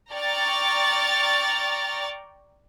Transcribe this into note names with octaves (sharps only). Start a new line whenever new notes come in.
D5 G5 A#5 C#6 F6 A6